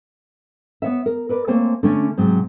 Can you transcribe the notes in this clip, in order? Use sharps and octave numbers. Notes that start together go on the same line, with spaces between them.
B3 C#5 E5
A#4
A#4 B4 D5
A3 A#3 C4 C5 C#5 G#5
D3 A3 C#4
G#2 C3 F#3